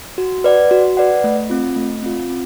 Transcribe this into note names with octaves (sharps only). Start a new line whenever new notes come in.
F#4
B4 D5 F#5
F#4
B4 D5 F#5
A3
C4 F4
A3
C4 F4
C4